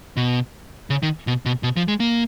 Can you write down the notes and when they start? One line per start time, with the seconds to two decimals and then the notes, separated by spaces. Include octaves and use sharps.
0.17 B2
0.90 C#3
1.03 D#3
1.27 B2
1.46 B2
1.63 B2
1.77 F3
1.88 G#3
2.00 A#3